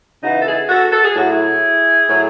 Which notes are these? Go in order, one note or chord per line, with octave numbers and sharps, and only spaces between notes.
C#3 E3 D#4 F#4
A4
E4 G#4
F#4 A4
A4
G#4
A2 F#3 F#4
E4 G#4
A2 F#3